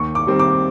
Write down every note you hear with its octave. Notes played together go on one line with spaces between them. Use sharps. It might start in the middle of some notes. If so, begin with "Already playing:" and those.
Already playing: D#2 C#6
D6
D#3 G3 C4
D6